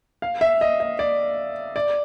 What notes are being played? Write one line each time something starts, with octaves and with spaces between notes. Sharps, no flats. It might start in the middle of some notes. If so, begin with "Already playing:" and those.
F5
E5
D#5
D#5
D5
D5